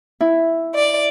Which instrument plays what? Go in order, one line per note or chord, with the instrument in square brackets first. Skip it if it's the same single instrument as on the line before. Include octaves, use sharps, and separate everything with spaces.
[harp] E4
[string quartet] D5